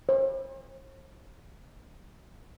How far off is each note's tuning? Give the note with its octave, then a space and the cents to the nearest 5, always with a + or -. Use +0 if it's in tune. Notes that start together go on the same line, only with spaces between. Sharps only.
C5 +45